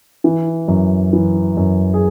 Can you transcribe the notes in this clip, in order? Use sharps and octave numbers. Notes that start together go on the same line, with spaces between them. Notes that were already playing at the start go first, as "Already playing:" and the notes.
E3
F#2
E3
F#2
G#4